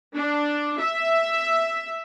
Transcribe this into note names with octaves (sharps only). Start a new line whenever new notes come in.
D4
E5